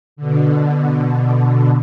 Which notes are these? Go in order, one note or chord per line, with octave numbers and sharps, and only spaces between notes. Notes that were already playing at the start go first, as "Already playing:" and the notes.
B2 D3